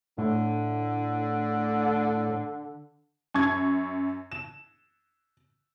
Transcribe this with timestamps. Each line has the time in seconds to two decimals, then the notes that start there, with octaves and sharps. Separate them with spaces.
0.18 A2 D3
3.34 F#2 C#6 G#6
4.32 E7